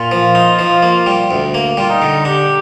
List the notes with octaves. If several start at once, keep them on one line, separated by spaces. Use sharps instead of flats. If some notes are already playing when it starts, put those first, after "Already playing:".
Already playing: A#2 F4
F3
D#4
F3
A#3
G3
D2
A#3
G3 F4
D#4
D3
D4 G4